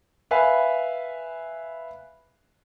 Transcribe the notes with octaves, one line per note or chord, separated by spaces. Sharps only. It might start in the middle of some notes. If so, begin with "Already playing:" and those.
B4 E5 F5 G#5 B5